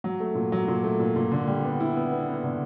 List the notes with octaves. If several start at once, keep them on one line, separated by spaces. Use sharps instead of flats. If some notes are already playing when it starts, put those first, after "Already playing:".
F#3
A3
A#2
F#3
A#2
A3
A#2
A#2
D3
G3
B3
E4
B3
B3
B3
D3